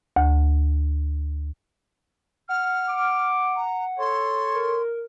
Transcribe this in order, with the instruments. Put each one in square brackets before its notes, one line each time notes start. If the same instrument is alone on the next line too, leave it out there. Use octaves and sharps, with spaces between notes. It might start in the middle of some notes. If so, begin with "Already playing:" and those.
[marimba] D2
[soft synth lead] F#5 [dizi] F6
[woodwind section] D6
[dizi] A#5
[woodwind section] A4 C#5 [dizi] C6
[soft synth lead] A#4